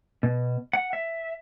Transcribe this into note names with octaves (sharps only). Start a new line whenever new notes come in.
B2
F#5
E5